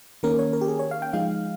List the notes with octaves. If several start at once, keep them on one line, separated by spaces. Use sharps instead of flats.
D#3 A#3 C#4 A#4
C#5
A#4
G4
G#4
C#5
F5
G5
F3 G#3 D#4 F5